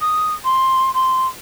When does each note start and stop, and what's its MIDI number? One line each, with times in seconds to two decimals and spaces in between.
0.01 0.33 87
0.44 0.89 84
0.94 1.27 84